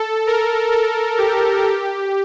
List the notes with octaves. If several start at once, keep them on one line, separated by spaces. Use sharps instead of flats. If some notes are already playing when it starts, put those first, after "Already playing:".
Already playing: A4
A#4
A4
G4
G4